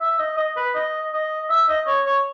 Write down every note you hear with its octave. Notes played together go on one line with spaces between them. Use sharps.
E5
D#5
D#5
B4
D#5
D#5
E5
D#5
C#5
C#5